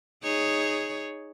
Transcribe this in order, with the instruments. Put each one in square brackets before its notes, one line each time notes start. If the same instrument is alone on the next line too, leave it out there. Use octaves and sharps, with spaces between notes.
[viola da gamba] D#4 G#4 C#5